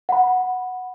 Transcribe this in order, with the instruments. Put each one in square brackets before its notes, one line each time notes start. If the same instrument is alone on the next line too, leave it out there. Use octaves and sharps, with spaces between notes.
[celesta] F#5 B5